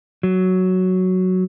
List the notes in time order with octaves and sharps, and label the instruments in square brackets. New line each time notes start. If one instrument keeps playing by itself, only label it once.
[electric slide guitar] F#3